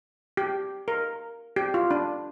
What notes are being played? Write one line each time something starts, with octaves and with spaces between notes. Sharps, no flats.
G4
A#4
G4
F4
D4